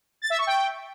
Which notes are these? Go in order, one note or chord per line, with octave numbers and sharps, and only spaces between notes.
A6
E5
C#6
G5